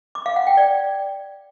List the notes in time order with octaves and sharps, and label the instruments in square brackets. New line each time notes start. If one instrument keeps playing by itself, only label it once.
[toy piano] D6
F5
F#5
G5
D5